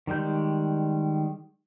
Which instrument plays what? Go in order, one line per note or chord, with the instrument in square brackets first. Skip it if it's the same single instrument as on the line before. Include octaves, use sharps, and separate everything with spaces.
[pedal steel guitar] D#3 G3 G#3 G6